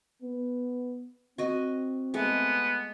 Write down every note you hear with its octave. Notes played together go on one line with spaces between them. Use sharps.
B3
C4 F#4 D#5
G#3 A3 B3